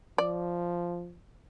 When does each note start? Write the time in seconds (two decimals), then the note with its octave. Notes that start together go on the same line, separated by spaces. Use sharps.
0.18 F3 D5